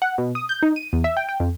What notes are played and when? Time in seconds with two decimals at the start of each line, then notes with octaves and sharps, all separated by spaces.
0.02 F#5
0.18 B2
0.35 D#6
0.49 G6
0.63 D#4
0.76 D#7
0.93 E2
1.04 E5
1.17 G5
1.29 G5
1.40 F2